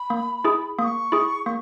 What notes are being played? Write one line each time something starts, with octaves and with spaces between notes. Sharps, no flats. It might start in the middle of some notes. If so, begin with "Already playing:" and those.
Already playing: B5
A#3
E4 G#4
A#3 C#6 D#6
E4 G#4
A#3 C#6